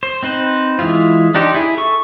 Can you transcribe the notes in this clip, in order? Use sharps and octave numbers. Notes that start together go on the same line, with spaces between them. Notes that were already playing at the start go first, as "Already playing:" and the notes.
C5
C4 D#4 B4 C5
E3 G#3 E4 F4
D4 D#4 G4 C5
E4 G#4
A4 C#6